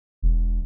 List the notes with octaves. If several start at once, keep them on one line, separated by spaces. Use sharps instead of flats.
E1